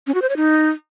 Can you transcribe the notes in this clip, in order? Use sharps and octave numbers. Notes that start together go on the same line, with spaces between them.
C#4
F#4
C5
C#5
D#4